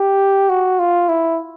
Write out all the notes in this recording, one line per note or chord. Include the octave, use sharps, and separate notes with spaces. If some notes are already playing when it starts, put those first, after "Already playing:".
Already playing: G4
F#4
F4
E4